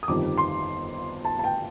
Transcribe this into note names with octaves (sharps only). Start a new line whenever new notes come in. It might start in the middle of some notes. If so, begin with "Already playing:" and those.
D#6
G1 F2 D#3 G3 D6
C6
A5
A5
G5